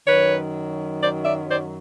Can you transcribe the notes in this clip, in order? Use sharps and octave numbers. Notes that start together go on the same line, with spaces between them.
F#2 D#3 F#3 B4 C#5
C5 D5
D5 E5
C5 D5